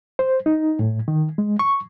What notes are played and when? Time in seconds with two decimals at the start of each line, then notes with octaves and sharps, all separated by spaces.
0.19 C5
0.46 D#4
0.79 A2
1.08 D#3
1.38 G#3
1.59 C#6